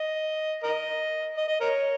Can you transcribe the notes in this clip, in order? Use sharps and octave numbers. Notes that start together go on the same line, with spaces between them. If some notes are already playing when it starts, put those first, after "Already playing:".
Already playing: D#5
A#4 D#5
D#5
D#5
A#4 C#5